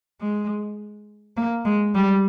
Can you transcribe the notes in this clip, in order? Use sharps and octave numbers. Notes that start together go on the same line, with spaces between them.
G#3
A#3
G#3
G3